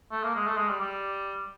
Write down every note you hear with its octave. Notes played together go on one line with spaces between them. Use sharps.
A3
A#3
G#3
A3
G#3
G3
G3